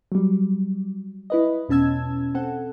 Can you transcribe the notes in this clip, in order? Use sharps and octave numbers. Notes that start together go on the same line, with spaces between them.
F#3 G3
E4 B4 D#5
E2 B2 C#4 A5 E6 G#6
C4 A4 F#5